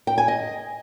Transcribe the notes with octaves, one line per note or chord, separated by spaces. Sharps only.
G5
G#5
D#5